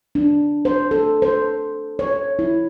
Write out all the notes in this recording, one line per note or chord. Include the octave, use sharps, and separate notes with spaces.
D4
C5
A4
C5
C#5
E4